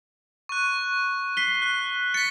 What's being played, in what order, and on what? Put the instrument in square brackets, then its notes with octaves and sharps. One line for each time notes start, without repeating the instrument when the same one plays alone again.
[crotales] C#6 F#6
[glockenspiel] B6 C7 G7
[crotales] F#6
[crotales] A6 B6 [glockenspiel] C#7